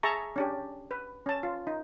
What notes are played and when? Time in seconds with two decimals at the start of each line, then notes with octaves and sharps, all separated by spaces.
0.03 G#4 E5 A5 A#5 C#6
0.36 C#4 D4 G4
0.91 B4
1.26 C#4 A5
1.43 F4
1.67 D#4